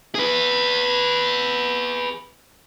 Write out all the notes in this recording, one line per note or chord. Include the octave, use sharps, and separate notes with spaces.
G#4 B4